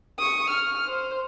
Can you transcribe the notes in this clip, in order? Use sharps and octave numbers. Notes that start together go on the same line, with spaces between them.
C#6 D#6
F6
C5